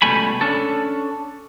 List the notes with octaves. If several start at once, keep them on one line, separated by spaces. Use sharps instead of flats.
C#2 B2 G3 A3 G#5 B5
C#4 D4 A4